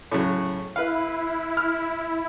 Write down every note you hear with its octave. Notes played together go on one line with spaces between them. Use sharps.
A2 C#3 F#3
E4 B4 F5
F6